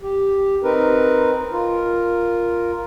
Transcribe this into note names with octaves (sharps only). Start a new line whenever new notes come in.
G4
C4 D#4 A#4 B4
F4 A#4